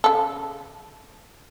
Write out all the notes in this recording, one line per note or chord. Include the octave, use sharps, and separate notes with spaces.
C#3 A4